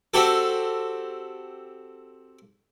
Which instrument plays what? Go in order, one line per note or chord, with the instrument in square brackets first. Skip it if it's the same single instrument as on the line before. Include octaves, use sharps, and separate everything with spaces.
[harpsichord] C4 F#4 G4 A4